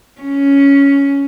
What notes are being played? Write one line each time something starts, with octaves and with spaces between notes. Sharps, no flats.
C#4